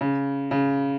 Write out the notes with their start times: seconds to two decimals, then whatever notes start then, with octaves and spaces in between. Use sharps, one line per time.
0.01 C#3
0.51 C#3